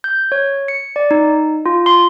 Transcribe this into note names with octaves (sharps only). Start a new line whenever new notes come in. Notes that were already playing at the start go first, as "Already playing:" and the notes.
G6
C#5
C#7
D5
D#4
F4
C6